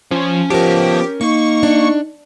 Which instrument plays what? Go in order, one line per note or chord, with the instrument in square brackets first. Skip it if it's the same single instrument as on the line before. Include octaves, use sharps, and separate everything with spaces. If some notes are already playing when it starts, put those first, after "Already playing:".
[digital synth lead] F3 [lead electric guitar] C#4 G#5
[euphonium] F3 [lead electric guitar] B3 A5 [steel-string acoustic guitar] C#4 A#4 [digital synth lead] G4
[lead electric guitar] A#3 [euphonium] D#4 [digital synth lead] C#6
[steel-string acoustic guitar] D4